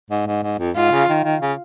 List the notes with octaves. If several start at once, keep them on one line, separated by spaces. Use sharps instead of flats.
G#2
G#2
G#2
F2
G#2 F4
C#3
D#3
D#3
C#3